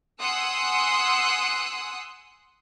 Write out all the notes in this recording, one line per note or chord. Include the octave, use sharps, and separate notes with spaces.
F#5 G#5 C6 D#6 E6 F#6